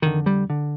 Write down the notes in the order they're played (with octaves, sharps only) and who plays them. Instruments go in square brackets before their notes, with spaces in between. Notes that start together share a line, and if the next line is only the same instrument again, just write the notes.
[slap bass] F2 D3 D#3
G3
D3